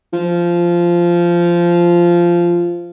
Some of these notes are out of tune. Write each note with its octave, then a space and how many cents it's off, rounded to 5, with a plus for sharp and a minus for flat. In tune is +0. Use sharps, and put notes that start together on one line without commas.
F3 -10